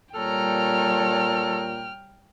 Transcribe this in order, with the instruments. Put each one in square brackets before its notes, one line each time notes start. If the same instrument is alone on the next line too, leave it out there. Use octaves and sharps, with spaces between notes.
[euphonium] A#2 [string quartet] G3 C#5 A#5 [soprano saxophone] A4 [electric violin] G5 F6